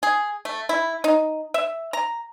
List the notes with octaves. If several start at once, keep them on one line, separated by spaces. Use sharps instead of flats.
G#4
A3
E4
D#4
E5
A#5